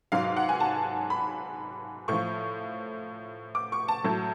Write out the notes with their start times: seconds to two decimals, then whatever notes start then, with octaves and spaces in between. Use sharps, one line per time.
0.12 G#2 F#3 F5
0.24 F5
0.37 F#5
0.49 G#5
0.60 A5
1.10 B5
2.08 A2 F3 C#6
3.55 D6
3.72 C#6
3.88 A5
4.04 A2 F#3